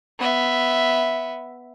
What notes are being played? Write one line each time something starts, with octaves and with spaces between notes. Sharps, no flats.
B3 E5